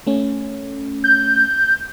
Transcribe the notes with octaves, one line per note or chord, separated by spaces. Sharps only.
A3 C#4
G6